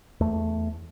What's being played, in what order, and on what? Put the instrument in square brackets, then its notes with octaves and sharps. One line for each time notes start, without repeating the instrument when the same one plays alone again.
[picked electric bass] E2 A3